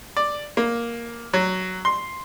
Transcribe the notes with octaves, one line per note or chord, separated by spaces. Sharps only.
D5
A#3
F#3
C6